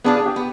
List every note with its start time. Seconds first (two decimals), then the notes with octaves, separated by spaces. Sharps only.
0.04 B3 D4 F4 G#4
0.16 G#4
0.26 G4
0.36 B3